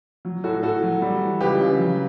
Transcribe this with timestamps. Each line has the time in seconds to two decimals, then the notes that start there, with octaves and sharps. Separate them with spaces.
0.25 F#3
0.44 A2 F#4 A4
0.63 A2 F#4 A4
0.83 F#3
1.02 G3
1.21 E3
1.41 C#2 G4 B4
1.60 C#3
1.79 F#3